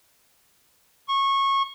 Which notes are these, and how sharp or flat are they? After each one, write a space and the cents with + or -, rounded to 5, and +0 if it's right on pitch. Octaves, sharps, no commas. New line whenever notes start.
C#6 -20